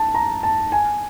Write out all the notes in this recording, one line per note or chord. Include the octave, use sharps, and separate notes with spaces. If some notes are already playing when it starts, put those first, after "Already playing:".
Already playing: A5
A#5
A5
G#5